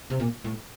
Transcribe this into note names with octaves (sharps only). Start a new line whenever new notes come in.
C3
A#2
A2